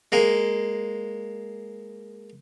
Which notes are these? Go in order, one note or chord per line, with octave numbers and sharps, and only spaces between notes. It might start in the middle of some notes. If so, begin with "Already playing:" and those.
G#3 A#3